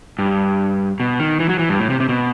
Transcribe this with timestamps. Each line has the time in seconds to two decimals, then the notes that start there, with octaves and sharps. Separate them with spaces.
0.19 G2
1.00 B2
1.19 D#3
1.40 E3
1.49 F#3
1.59 E3
1.69 G2
1.80 A2
1.90 C3
2.00 C3
2.09 B2